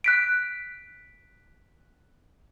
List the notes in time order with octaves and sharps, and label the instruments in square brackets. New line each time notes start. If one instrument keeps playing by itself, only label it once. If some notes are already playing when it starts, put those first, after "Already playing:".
[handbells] F#6 B6 D7